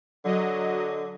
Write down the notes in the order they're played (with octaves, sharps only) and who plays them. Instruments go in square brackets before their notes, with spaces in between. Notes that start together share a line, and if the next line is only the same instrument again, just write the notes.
[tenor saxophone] D3 [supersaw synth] F#3 D#5